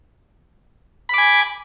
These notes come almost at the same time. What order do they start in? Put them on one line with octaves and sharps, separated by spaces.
B5 D6 G#5